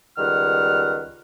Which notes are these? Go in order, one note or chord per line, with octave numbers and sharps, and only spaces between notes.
C#2 D#3 G3 F#5 F6